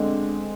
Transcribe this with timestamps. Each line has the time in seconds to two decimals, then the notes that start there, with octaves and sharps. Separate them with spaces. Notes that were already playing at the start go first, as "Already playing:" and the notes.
Already playing: D3 G#3 C4